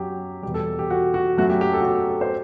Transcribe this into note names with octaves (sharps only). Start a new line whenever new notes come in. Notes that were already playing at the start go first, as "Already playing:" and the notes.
Already playing: F#2 F#3 G4
E2 B2 G3 G4
A4
G4
F#4
F#4
F#2 F#3 A3 F#4
G4
G4
A4
F#4
G4
G4
A4
C5